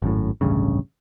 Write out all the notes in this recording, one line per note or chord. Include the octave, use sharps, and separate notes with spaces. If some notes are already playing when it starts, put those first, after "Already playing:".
G#1 F#2 A2
D1 A1 G2 C#3